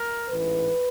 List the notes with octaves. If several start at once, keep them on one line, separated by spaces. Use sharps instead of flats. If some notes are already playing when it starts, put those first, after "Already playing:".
Already playing: A#4
A1 G#2 E3 B4